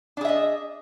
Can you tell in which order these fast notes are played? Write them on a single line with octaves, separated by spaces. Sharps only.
D4 G#4 E5 D#5